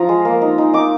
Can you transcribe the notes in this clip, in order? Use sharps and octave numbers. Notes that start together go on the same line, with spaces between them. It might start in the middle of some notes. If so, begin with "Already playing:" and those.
Already playing: F3 F4 A#5 D#6
G#3
A#3
D#4
D#4
D#4 D6